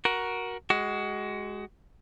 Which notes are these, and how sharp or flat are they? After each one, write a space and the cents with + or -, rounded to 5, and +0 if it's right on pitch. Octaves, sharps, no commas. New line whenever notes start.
F#4 +0 A#4 +15
G#3 +5 F#4 +25